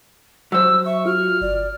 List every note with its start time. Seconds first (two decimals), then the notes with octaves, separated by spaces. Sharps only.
0.52 F#3 C5 E6
0.86 E5 C#6
1.06 F4 F#4 F6
1.41 G1 D5